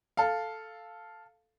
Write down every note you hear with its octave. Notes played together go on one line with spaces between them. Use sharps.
A4 F5